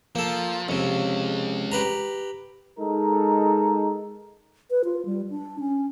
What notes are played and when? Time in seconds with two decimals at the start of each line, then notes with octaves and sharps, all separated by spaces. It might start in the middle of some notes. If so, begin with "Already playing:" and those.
0.15 F3 A#3 A4
0.69 F2 C3 G#3 C#4
1.72 G4 B4 A#5
2.79 G#3 D#4 A4 A#4
4.71 B4
4.84 F4
5.06 G3
5.30 D4
5.59 C#4